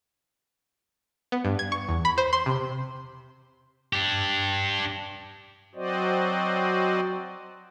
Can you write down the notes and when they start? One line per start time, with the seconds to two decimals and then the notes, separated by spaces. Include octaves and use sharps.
1.32 B3
1.45 G2
1.59 G#6
1.72 C#6
1.89 E2
2.05 B5
2.18 C5
2.33 C6
2.46 C3
3.93 D4 G4
5.75 F#3 C4 F#4 C5 D5 D#5